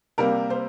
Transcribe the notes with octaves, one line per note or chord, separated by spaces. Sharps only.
C3 G3 A#3 A#4
C5